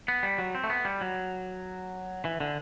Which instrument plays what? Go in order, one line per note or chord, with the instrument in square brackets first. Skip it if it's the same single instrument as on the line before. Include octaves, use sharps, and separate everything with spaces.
[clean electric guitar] B3
G3
F#3
C4
A3
B3
G3
F#3
E3
D3